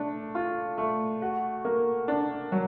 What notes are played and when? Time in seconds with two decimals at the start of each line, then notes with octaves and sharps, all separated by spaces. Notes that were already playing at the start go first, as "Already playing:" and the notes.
Already playing: A3 D4
0.35 F4
0.78 A3
1.22 F#4
1.65 A#3
2.08 D4
2.52 F#3